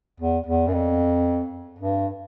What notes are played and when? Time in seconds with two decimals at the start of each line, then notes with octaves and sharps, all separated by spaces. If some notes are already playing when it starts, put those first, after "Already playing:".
0.20 E2
0.46 E2
0.68 F#2
0.73 F2
1.79 G2